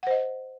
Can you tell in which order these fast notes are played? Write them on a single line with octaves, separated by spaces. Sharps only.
F#5 C5 D#5